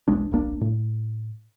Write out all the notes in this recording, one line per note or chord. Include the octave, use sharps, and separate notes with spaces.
E1 B1 G#3 D4
D1 A#1 A#3 D4
A2